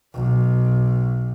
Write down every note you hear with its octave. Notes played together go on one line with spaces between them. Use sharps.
B1